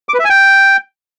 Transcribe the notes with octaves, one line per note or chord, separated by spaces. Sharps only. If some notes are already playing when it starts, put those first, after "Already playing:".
D6
B4
E5
G#5
G5